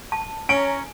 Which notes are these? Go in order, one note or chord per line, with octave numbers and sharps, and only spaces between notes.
A5
C#4 G#5 A#5 D7